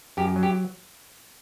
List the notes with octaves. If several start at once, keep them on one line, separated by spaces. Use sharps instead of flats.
F#2 G4
F#3
G4